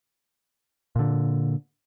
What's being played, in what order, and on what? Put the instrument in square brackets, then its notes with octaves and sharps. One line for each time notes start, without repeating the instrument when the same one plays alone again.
[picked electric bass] A#2 D3